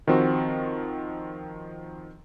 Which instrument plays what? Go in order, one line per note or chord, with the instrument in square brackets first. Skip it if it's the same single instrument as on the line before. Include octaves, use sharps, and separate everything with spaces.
[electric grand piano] D#3 F3 C4 F#4